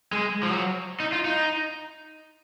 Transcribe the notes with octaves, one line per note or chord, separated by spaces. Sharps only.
G#3
F3
F#3
D#4
F4
D#4